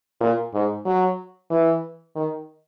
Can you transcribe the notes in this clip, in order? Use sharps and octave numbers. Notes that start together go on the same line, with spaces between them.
A#2
G#2
F#3
E3
D#3